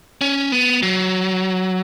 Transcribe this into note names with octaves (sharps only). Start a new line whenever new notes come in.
C#4
B3
F#3